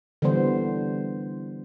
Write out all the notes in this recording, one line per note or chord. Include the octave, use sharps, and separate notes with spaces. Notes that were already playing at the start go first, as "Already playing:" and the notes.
D3 E3 G3 B3 C5